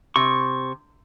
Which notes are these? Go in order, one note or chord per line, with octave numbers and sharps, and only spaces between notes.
C3 C#6